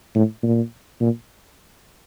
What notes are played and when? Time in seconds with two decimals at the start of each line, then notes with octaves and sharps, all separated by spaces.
0.15 A2
0.43 A#2
1.00 A#2